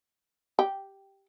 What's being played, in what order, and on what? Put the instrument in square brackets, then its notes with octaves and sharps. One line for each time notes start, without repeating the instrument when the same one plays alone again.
[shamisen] G4